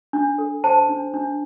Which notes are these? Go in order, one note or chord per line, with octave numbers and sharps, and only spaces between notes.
D4
A4
C5 A5
D4
D4